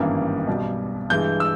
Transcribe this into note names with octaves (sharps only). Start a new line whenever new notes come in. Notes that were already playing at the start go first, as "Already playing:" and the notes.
Already playing: G#1 G2 E3 A#3 C#4
B1 B2 G3
G2 E3 G#3 G6
E6